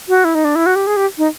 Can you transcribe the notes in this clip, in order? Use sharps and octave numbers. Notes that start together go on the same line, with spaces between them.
F#4
E4
D#4
D4
E4
F#4
G4
G#4
G4
D#4